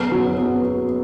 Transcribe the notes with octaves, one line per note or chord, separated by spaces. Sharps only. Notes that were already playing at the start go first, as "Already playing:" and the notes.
Already playing: F#1 B3
F#3
B3